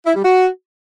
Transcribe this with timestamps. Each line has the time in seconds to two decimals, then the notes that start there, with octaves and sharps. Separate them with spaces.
0.06 E4
0.15 G3
0.25 F#4